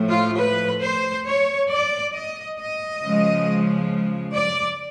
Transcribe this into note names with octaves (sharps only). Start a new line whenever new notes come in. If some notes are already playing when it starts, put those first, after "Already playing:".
Already playing: A2 F3 A3
F4
B4
C5
C#5
D5
D#5
D#5
C#3 F3 G#3
D5